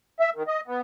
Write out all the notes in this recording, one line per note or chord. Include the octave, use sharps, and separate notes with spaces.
E5
D#3
D#5
B3